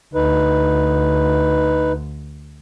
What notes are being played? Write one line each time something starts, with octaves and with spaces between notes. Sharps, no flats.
D2 D#4 B4